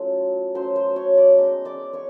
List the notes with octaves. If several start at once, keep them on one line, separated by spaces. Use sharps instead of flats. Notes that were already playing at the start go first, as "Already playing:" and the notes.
Already playing: F#3 A3 C#4 F4
F#3 A3 C#4 C5 C6
C5 C6
C#5 C#6
D5 D6
G#3 B3 D#4 D#5 D#6
D5 D6
C#5 C#6